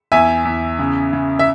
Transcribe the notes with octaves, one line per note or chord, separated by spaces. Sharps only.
E2 E5 G#5
E2
C#3
C#3
E5